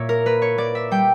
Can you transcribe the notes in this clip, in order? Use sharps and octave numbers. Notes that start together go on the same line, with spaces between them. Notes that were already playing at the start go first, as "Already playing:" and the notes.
Already playing: A#2 A#3 C#5 E5
A#4
A#3 B4
C#5
A#3 D5
E5
G3 G5